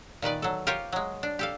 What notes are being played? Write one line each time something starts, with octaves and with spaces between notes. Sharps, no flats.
A#2 D#3 B4 D5
F#3 A4
F4 G4 A#4 C5 C#5
F#3 G#3
D4
G4 A4 F5